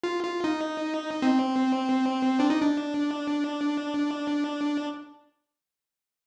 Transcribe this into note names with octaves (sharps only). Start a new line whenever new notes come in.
F4
F4
D#4
C4
D4
D#4
D4